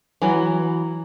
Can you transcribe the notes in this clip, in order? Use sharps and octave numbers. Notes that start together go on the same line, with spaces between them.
E3 F#3